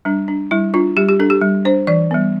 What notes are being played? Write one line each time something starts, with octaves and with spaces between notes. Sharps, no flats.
G3 D4
D4
G3 E4
D4 F4
G3 G4
G4
D4 A4
G4
G3
D4 C5
E3 D5
G3 B3